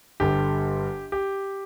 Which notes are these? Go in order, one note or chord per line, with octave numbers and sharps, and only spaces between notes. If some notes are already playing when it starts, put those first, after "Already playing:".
G1 G2 D3 G4
G4